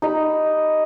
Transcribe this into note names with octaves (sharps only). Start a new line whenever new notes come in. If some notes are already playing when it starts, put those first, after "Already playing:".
D#4 G4 D#5 B5